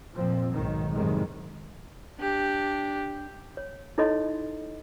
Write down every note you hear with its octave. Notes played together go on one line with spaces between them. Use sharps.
F2 A#2 F3 C4
B1 G#2 D#3
F#2 A2 C3 D#3 G3 G#3
D4 G4
C#5
D#4 E4 A4 C#5 D#5 C6